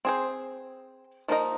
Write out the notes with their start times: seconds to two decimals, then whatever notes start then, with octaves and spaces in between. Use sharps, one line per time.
0.05 C4 G#4 C5
1.28 F3 A#3 D#4 A#4 D#5